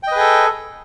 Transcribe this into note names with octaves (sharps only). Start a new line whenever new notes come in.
G#4 A4 B4 D#5 G5